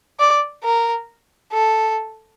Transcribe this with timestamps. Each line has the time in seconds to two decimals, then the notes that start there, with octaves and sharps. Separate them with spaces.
0.20 D5
0.64 A#4
1.53 A4